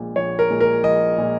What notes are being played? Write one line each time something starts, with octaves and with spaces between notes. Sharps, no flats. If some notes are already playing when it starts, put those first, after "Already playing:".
Already playing: A#1 A#2 G#3
A#1 C#5
A#4
A#2 G#3
A#4
A#1 D#5
A#2 G#3